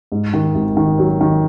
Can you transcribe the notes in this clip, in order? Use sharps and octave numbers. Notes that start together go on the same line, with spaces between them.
G#2
D#3
G#1
D#3
F#3
D#3